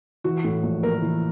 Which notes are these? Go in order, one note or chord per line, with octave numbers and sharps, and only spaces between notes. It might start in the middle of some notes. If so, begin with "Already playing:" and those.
E3 F#4
A2
A#1
A#1 A#4
E3